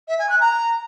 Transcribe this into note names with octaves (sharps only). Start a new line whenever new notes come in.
E5
G#5
F#6
A#5